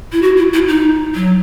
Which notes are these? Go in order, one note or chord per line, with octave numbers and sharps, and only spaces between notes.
E4
F#4
E4
E4
D#4
F#3